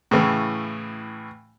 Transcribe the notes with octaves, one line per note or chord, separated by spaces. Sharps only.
A2 C#3 E3